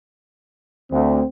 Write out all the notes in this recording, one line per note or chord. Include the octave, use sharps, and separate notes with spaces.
D2 C4